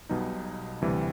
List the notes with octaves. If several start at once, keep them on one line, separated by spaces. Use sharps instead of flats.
B1 B2 G3 B3 D#4
D2 C3 E3 G3